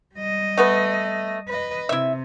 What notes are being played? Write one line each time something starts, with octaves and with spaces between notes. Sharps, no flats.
G3 D#5
A3 B3 B4
B4 D#5
C3 E4 E5